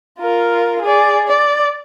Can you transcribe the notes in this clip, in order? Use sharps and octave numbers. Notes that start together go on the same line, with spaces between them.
F4 A#4
G#4 D5
D5